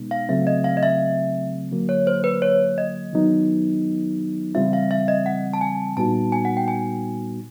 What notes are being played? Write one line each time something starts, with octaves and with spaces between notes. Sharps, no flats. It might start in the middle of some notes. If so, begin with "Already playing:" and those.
Already playing: B2 G#3 B3 D#4
F5
C#3 F#3 A3 C4 E5
D#5
F5
D#5
E5
D3 F#3 A#3
C#5
C5
B4
C#5
D#5
D#3 F#3 B3 D#4
C#3 E3 G3 C4 F4 E5
F5
E5
D#5
F#5
A5
G#5
A#2 G3 B3 D#4 F#4 A5
G#5
F#5
G5
G#5